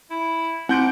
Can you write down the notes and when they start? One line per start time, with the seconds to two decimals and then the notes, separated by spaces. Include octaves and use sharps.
0.10 E4
0.69 C3 C4 F#5 G6 D7